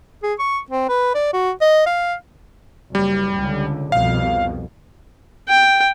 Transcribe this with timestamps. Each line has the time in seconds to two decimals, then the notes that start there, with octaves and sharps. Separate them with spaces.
0.23 G#4
0.39 C#6
0.70 C4
0.89 B4
1.14 D5
1.33 F#4
1.61 D#5
1.86 F5
2.95 F#1 G3
3.39 C#2 D3
3.92 C2 F2 B2 F5
5.49 G5